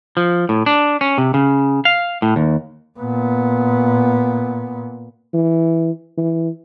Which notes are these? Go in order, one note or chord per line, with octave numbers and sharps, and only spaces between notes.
F3
A2
D4
C#4
C3
C#3
F5
A2
D#2
A#2 B3
E3
E3